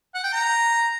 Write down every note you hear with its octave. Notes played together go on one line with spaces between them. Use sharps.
F#5
G5
A#5